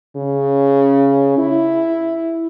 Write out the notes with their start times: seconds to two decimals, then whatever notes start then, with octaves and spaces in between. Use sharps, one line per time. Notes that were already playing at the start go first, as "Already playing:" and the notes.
0.16 C#3
1.38 E4